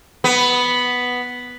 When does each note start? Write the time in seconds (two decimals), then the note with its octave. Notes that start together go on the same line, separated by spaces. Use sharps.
0.24 B3